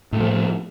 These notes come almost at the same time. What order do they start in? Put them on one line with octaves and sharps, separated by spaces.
A2 A3 F3